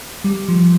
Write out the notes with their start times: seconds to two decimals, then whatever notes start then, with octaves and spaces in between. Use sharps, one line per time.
0.24 G3
0.49 F3